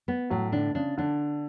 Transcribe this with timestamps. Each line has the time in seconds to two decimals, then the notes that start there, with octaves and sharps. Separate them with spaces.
0.08 B3
0.30 A2 F#3
0.52 D3 D4
0.75 C#3 D4
0.98 D3 D4